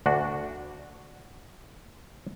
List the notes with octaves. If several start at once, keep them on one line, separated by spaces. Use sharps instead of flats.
D2 D4 F#4